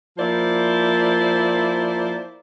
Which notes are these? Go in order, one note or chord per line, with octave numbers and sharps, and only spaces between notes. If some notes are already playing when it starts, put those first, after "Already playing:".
F3 A#3 E4 C5 D5